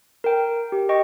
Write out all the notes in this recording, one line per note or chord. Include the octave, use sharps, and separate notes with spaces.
A#4 G5
G4
D#5 G5 C#6